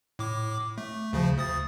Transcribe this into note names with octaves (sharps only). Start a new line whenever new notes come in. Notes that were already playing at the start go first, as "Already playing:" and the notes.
A2 D6
A3
D2 C#3 F3
D2 D#6 A6